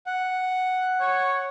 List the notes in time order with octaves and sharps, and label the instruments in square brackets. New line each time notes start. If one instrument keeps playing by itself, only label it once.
[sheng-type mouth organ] F#5
[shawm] C#5